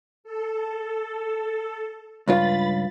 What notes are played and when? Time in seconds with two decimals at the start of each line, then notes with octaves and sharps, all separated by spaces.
0.24 A4
2.28 C#2 G2 F4 B5 A6